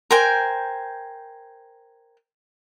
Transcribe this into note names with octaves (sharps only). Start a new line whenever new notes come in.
A#4 C5 G5 G#5